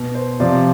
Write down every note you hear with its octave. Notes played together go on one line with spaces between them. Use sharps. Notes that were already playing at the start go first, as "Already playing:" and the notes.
Already playing: B2
C5
C3 F3 D5